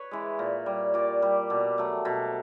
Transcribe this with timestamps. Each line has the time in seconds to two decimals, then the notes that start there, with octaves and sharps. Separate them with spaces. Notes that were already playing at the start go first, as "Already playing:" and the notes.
Already playing: B4 C#5
0.11 E3 G#3
0.39 A#2
0.66 G3
0.94 A#2 D5
1.22 G3
1.50 B2
1.78 F#3 A3
2.05 B2